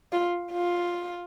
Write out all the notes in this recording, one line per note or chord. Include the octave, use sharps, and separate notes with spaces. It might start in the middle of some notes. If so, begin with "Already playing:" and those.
F4
F4